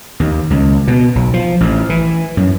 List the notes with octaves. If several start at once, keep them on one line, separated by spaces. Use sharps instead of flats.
D#2
C#2
B2
B1
F3
A1
E3
F#2